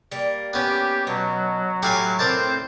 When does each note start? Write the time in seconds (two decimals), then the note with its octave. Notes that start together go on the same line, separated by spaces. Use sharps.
0.11 G3 A#3
0.53 B3 C#4 G4
1.07 B2 F#3 A5
1.83 A2 E4 G4 F5 G#5
2.19 C4 A#4 C5 D5 A5